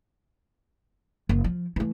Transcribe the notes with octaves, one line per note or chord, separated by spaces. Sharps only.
F#1
F3
E3 A3